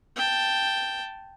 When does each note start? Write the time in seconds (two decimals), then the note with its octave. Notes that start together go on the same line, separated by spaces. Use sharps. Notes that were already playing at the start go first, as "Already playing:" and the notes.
0.16 G5 A5